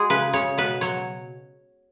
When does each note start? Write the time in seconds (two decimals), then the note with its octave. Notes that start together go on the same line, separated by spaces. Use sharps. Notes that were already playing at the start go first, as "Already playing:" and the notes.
Already playing: G#3 F#4 G#4
0.10 C#3 B4
0.33 C#3 C#5
0.58 B2 B4
0.81 F#3 C#5